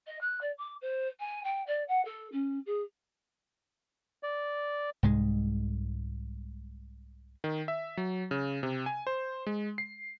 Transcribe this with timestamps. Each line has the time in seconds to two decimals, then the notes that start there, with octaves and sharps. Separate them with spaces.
0.07 D#5
0.21 F#6
0.41 D5
0.58 D6
0.81 C5
1.19 G#5
1.44 G5
1.66 D5
1.88 F#5
2.05 A4
2.32 C#4
2.66 G#4
4.23 D5
5.03 C2 G#2 G#3
7.44 D#3
7.68 E5
7.97 F#3
8.31 C#3
8.63 C3
8.86 G#5
9.07 C5
9.47 G#3
9.78 C7